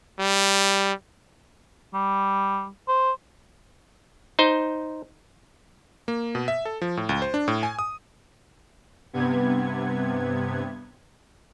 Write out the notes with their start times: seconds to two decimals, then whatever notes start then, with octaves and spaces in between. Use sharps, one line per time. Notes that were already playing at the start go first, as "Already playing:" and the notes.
0.19 G3
1.94 G3
2.88 C5
4.39 D#4 C5
6.08 A#3
6.35 B2
6.48 E5
6.65 A4
6.82 F3
6.97 A2
7.09 C#2
7.22 C5
7.34 D4
7.48 A2
7.63 G#5
7.79 D#6
9.13 G2 C3 B3 G#6